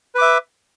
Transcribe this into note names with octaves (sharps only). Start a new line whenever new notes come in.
B4 E5 D6